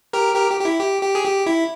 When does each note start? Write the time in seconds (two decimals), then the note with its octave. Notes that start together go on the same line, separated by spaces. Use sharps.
0.13 G4 A#4
0.35 G4 A#4
0.50 G4
0.61 G4
0.65 E4
0.80 G4
1.02 G4
1.15 G#4
1.24 G4
1.46 E4